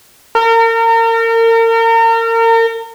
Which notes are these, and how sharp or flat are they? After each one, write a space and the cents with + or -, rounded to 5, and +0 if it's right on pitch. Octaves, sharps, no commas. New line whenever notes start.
A#4 -35